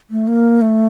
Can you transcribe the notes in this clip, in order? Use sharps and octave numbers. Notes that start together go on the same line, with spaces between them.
A3
A#3
A3